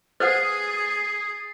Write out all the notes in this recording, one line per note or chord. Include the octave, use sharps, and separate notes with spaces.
G#4 B4 C5 F#5 D#6 A6 C7